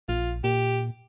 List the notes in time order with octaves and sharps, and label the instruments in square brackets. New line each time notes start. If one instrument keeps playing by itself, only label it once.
[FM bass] A#1 [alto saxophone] F4
[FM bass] A#2 [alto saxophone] G4